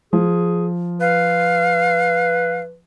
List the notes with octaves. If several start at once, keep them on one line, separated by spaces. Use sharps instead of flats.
F3 G#4
B4 F5